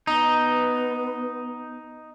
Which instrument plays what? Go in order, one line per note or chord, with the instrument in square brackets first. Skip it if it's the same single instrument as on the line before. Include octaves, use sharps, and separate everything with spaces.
[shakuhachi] B3 [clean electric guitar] D#4